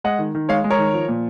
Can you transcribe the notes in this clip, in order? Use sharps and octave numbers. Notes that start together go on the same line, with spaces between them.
G#3 D#5 F#5
D#3
D#3
G#3 C#5 F5
G#3
A#4 C#5
D#3
F3
A#2